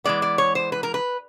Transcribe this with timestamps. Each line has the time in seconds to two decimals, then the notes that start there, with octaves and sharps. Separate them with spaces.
0.04 E3 G#3 B3 D5
0.22 D5
0.38 C#5
0.55 C5
0.72 B4
0.83 A#4
0.94 B4